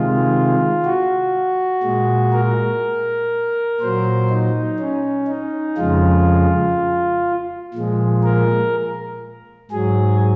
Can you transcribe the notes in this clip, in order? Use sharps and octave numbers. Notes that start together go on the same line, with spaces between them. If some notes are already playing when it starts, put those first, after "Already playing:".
Already playing: C3 D#3 G#3 F4
F#4
A#2 G#3
A#4
A#2 F#3 C5
D#4
C#4
D#4
F2 C#3 F3 G#3 F4
A#2 F3 G#3
A#4
G#2 F#3 G#4